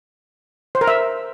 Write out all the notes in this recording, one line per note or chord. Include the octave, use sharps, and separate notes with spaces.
C5
A#4
E5